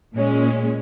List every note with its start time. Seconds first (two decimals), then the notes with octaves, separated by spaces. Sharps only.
0.15 A#2 G#3 C#4